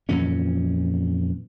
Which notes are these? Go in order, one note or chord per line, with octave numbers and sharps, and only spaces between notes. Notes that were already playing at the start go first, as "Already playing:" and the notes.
F2 A#2 E3 C#4